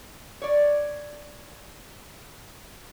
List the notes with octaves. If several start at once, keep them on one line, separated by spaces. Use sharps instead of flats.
C#5 D5